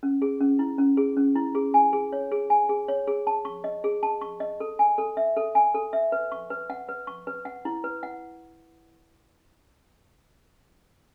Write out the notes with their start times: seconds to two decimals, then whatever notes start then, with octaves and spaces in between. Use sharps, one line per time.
0.03 C#4
0.22 G#4
0.40 C#4
0.59 E4
0.78 C#4
0.97 G#4
1.17 C#4
1.36 E4
1.55 G#4
1.74 G#5
1.93 G#4
2.13 C#5
2.31 G#4
2.50 G#5
2.69 G#4
2.88 C#5
3.07 G#4
3.27 A5
3.45 C#6
3.64 D#5
3.84 G#4
4.03 A5
4.21 C#6
4.40 D#5
4.60 A4
4.79 G#5
4.98 A4
5.17 E5
5.37 A4
5.55 G#5
5.74 A4
5.93 E5
6.12 B4
6.32 C#6
6.50 B4
6.70 F#5
6.89 B4
7.07 C#6
7.27 B4
7.45 F#5
7.65 E4
7.84 B4
8.03 F#5